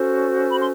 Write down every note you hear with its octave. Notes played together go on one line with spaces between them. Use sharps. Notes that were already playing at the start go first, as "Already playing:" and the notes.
Already playing: C#4 F#4 A4 C5
B5
C6